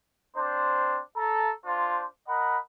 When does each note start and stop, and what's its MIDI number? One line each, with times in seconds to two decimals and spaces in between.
0.36 0.98 60
0.36 0.98 62
0.36 0.98 72
1.16 1.52 69
1.16 1.52 82
1.65 2.04 62
1.65 2.04 65
1.65 2.04 72
2.27 2.57 70
2.27 2.57 75
2.27 2.57 78
2.27 2.57 83